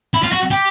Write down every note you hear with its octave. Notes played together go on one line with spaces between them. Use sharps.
E4
F4
F#4
G4